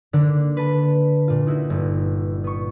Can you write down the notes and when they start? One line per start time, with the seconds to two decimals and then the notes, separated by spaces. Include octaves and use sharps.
0.13 D3 A#3 D4
0.57 B4 A5
1.28 A#2 F4
1.47 D#4 E4 F#4
1.70 G1
2.44 B3 C#6